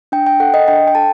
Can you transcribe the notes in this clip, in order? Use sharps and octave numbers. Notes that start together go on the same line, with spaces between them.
D4 G5
G5
A4 F#5
D#5
D4 G5
G5
A4 A5